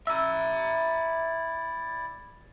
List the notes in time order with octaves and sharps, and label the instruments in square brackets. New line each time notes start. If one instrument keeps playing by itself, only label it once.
[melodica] E4 D5 [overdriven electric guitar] E5 A#5 [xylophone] E6